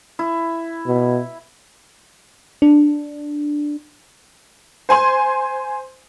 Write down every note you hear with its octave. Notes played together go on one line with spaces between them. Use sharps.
E4
B2
D4
C5 G#5 C6